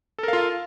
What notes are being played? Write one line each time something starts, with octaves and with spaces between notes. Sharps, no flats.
F4 A4 A#4 F5